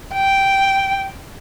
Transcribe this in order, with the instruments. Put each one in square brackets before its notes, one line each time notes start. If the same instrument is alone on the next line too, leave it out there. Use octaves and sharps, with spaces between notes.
[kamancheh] G5